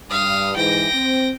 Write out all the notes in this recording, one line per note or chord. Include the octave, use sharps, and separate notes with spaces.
G2 F5 D#6
G#2 E3 G5 A#6
C4